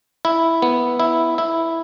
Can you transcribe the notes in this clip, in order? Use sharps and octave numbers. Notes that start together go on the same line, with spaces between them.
E4
B3
E4
E4